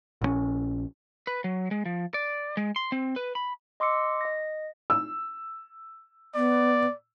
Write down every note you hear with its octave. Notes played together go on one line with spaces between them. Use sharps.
A#1 D#3 C#4
B4
F#3
G#3
F3
D5
G#3
C6
C4
B4
B5
D#5 C6 D6 E6 C#7
D#5 A#6
E6
B3 D5